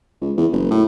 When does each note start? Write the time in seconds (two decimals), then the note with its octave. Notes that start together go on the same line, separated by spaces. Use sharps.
0.21 C#2
0.37 E2
0.53 F#1
0.71 A2